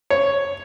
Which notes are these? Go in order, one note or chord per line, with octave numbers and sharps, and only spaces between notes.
C#5